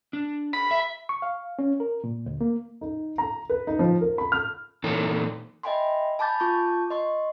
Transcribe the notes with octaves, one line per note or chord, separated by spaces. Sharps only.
D4
B5
E5
C#6
F5
C#4
A#4
A#2
D2
A#3
D#4
A#5
B4
D#4
F3
A#4
B5
F6
A#2 E3 D#4 A4 C#5
D#5 E5 G5 G#5 B5 C6
G#5 A5 B5 D6 G6 A6
F4 A5 C#6 D6 G6
D#5 C6 C#6